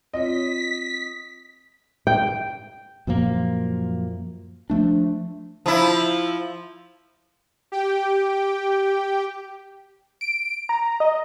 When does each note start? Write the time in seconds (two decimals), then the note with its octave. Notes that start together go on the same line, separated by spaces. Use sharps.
0.14 C4 F4 C#5 D#5 B6
2.07 G5
3.07 F#2 A#2 F3 A#3
4.70 F3 A3 D4
5.66 F3 E4
7.72 G4 G5
10.21 D7
10.69 A#5
11.00 D#5